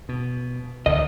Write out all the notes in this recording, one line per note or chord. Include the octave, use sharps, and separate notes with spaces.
B2
C#2 D3 D#3 D#5